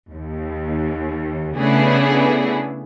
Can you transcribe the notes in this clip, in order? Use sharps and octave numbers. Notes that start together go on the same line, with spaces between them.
D#2
C#3 A3 B3 D4 E4 G#4